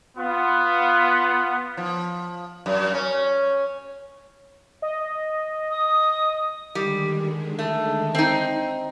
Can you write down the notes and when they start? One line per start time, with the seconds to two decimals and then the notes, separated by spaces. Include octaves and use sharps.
0.17 B3 F4
1.77 F3
2.66 F#2
2.94 C#4
4.82 D#5
5.71 D#6
6.75 D3 D#3 G3 G#3
7.59 A3
8.15 C4 D#4